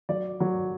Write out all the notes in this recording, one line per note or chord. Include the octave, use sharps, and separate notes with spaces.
F#3 D5
F#3